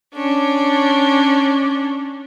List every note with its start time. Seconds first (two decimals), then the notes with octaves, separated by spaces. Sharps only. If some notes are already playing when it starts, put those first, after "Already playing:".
0.15 C#4 D4